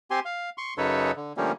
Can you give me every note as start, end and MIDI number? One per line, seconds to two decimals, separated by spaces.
0.11 0.20 60
0.11 0.20 67
0.11 0.20 80
0.11 0.20 84
0.25 0.50 77
0.58 0.74 84
0.58 0.74 85
0.78 1.11 42
0.78 1.11 49
0.78 1.11 63
0.78 1.11 69
0.78 1.11 71
0.78 1.11 73
1.16 1.33 50
1.37 1.52 50
1.37 1.52 53
1.37 1.52 55
1.37 1.52 57
1.37 1.52 58
1.37 1.52 61